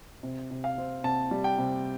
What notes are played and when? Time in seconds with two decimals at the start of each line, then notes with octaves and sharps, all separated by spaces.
0.23 C3
0.51 C3
0.64 F5
0.78 C4
1.04 C3 A5
1.31 G3
1.44 G5
1.58 C3